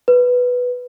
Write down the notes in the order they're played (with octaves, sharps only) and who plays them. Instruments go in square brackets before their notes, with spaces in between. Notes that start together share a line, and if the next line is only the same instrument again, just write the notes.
[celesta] B4